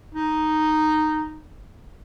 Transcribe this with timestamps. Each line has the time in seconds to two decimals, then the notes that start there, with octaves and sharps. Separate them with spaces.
0.14 D#4